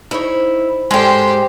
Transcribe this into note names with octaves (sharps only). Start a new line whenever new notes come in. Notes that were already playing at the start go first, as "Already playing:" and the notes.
D#4 E4 C5 C#5
G#2 G#3 C#4 G4 A4 C5 G5